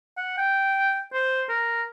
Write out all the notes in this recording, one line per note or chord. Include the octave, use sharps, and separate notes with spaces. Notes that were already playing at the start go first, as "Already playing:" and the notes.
F#5
G5
C5
A#4